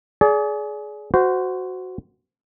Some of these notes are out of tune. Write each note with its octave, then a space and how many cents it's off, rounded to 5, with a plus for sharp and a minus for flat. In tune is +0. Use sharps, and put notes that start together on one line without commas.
G#4 +20 D5 -25
F#4 +0 C5 -20